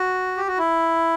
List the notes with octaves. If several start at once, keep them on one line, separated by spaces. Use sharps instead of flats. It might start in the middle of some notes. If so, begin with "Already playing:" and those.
Already playing: F#4
G4
F#4
E4